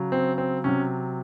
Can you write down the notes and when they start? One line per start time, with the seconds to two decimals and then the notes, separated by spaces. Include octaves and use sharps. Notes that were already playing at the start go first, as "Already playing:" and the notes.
Already playing: C#3 F#3
0.12 C4
0.38 C4
0.64 C3 F#3 C#4